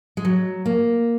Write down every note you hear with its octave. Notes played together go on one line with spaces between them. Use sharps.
G#3
F#3
A#3